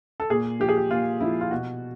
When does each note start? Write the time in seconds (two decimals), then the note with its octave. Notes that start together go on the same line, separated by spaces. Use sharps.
0.20 A4
0.30 A#2 G#4
0.60 F3 G4
0.68 G#4
0.77 G4
0.91 A#2 F4
1.20 F3 E4
1.41 F4
1.51 B2 F#4